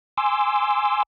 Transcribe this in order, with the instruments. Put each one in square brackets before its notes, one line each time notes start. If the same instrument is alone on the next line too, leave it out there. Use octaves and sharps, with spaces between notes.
[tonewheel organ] G#5 C6 D6 E6